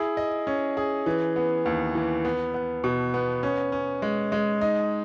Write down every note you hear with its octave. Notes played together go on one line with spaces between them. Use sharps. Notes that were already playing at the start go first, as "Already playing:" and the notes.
Already playing: E4 G#4
D#5
C#4
G#4
E3
B3
D#2
E3
B3
B3
B2
B3
C#4
C#4
G#3
G#3
D#4